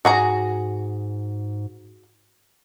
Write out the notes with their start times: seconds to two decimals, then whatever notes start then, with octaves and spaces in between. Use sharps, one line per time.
0.05 G#2 F#4 G#4 A#5